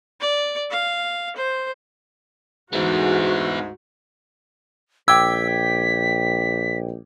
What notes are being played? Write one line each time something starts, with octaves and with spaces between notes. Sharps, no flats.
D5
F5
C5
D2 G#2 B3 E4 F#4
A#1 G5 D6 E6 G#6 B6